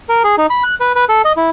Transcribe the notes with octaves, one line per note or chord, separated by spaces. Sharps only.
A#4
G#4
D#4
B5
F#6
B4
B4
A4
D#5
E4